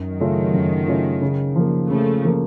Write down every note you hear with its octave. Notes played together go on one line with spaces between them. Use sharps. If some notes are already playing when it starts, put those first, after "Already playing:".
Already playing: F#2 D#3 F#3
C#3 A3 C#4 F4
F#2
C#3 A3 C#4 F4
C#3
F3 A#3
C#3 F3 A3
F3 A#3